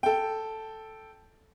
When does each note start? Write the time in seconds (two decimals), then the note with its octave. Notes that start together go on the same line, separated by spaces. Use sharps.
0.03 A4 G5